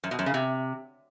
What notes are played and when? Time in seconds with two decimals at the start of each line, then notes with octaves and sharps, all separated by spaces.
0.04 F#2
0.11 B2
0.19 F#2
0.26 C#3
0.34 C3